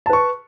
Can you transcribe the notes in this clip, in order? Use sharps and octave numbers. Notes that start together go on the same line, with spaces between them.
B4 A5 C#6